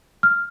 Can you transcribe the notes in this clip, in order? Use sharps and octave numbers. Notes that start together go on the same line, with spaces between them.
F6